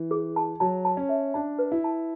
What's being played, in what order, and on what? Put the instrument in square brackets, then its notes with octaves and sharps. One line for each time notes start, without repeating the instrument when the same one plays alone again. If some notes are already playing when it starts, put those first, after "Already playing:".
Already playing: [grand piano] E3
[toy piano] G#4
A5
[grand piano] F#3 [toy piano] A5
[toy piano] A5
[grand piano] C#4
[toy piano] E5
[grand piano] D4 [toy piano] A5
[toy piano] B4
[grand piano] E4
[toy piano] A5